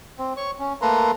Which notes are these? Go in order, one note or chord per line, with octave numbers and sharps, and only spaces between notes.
C4
C#5 C#6
C#4
A3 A#3 A4 B4 A#5 C6